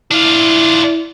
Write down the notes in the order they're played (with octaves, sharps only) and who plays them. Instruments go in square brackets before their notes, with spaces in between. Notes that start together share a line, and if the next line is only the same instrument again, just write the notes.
[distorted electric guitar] D4 F4 [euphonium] E4